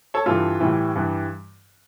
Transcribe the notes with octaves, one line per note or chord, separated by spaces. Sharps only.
A4 C#5
G2 E3 G3 F4 A4
A2 E3 G3
G2 E3 G3